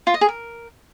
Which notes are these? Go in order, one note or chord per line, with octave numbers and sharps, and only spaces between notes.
F4
D#5
G#4
A#4